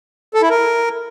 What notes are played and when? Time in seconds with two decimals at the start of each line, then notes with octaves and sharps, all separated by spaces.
0.34 A4
0.42 E4
0.50 A#4